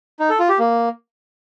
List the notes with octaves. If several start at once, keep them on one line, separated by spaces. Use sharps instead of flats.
D#4
A4
F4
G4
A#3